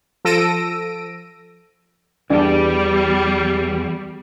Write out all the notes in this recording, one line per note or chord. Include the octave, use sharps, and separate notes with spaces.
F3 A4 E6 A#6 D7 D#7
E2 G3 D4